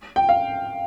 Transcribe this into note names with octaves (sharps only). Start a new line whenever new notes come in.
G5
F5